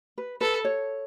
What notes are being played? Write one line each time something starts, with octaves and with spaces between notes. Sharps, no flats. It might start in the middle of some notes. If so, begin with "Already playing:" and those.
B4
A4 B4
C#5